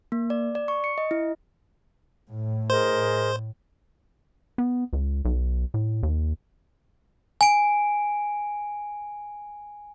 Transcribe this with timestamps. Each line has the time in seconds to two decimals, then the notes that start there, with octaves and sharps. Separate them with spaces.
0.12 A#3
0.30 D5
0.55 D5
0.68 C#6
0.84 C#7
0.98 D#5
1.11 E4
2.31 A2
2.70 G#4 A#4 C5 D#5
4.58 B3
4.93 C#2
5.25 B1
5.74 A2
6.03 D#2
7.41 G#5 D7